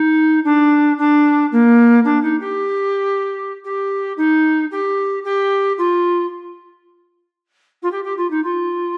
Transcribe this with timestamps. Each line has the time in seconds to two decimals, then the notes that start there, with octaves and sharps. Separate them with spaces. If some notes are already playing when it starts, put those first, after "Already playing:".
Already playing: D#4
0.44 D4
0.98 D4
1.51 A#3
2.04 D4
2.22 D#4
2.40 G4
3.64 G4
4.17 D#4
4.71 G4
5.24 G4
5.78 F4
7.82 F4
7.91 G4
8.04 G4
8.17 F4
8.30 D#4
8.44 F4